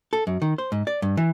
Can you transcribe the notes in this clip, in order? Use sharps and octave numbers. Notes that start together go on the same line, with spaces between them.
A4
F#2
D#3
C5
G#2
D5
G2
E3